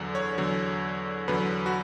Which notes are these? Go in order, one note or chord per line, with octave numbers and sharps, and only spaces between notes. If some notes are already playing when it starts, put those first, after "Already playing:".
Already playing: E2 D3 F#3
C#5
E2 D3 F#3
E2 D3 F#3 B4
F#4